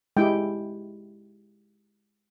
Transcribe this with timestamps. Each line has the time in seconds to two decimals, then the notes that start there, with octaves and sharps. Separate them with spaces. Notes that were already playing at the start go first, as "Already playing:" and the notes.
0.17 G#3 E4 G4 G5